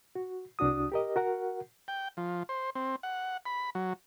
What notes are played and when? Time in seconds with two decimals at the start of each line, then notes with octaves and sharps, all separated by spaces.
0.15 F#4
0.59 C2 D4 F#4 D#6
0.92 G4 A#4 D#5
1.16 F#4 A#4 F#5
1.88 G5
2.17 F3
2.49 C5
2.75 C4
3.03 F#5
3.46 B5
3.75 F#3